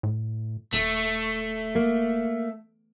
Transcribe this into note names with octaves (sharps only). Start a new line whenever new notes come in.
A2
D#1 A3
A#3